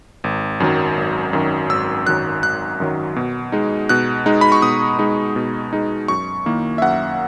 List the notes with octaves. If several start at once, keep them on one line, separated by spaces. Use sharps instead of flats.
G#1
F#2 D#3 F#3
G#1
F#2 D#3 F#3
G#1 E6
F#2 D#3 F#3 F#6
G#1 F#6
F#2 D#3 F#3
B2
G#3 D#4
B2 F#6
G#3 D#4
B5
C#6
B2 D#6
G#3 D#4
B2
G#3 D#4
F#2 C#6
D#3 A#3 E4
E5
F#2 F#5